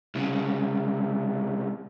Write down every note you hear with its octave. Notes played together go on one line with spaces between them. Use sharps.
C2 C#3